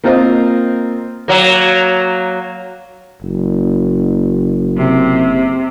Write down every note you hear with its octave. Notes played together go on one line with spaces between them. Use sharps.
A#3 C4 F4 A#4 C5 D#5
F#3 A#3
F#1
C3